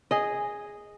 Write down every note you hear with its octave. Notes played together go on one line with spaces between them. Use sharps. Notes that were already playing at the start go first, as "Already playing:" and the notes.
G#4 D#5